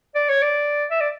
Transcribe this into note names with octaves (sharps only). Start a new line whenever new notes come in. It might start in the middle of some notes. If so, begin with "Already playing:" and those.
D5
C#5
D5
E5
D5